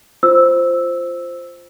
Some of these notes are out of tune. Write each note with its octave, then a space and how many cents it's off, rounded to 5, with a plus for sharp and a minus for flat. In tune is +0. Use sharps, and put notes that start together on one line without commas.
F4 -10 C5 +0 E6 -5